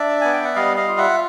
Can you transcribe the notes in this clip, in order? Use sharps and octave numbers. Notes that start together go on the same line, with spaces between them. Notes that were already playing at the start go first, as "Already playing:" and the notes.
Already playing: D4 D5 E5
B3 G#5
G5
F#5
G3 D#5 F5
D#5 F5
F4
E5 F#5